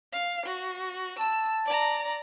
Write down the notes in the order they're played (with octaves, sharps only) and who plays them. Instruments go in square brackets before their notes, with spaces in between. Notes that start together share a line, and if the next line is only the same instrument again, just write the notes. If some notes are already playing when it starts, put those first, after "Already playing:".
[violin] F5
F#4
[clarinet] A5 [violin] E6
[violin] D5 A#5